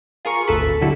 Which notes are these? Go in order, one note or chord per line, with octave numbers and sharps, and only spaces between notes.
F4 G#4 A#4 C#6
G#1 D2 A4 B4 B5
B2 D3 F#3 G3 E4 A4